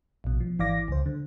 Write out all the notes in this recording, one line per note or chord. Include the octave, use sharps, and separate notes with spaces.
A#1 B2
F3
G#1 E3 D5 F5 D6 A#6
C#2 C5
D3